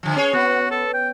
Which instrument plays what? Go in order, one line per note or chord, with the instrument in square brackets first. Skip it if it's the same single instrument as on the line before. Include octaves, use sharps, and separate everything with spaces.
[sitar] D3 F3
C#4 G#4 C#5
[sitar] B3 [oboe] F#4
[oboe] A4
G5